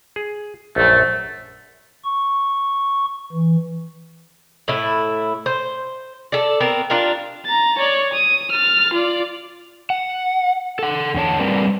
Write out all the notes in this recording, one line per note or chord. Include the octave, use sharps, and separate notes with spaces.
G#4
A#1 F#2 A3
C#6
E3
A2 E4
C5
A4 D5
B3 C4 A#4
D4 F4 G4 A#4
A#5 A6
C#5 D5
D#6
F6 A6
F4 D5
F#5
A4 F#5
E2 D3 C#5 A5
G3 C4 A#4 B4 D5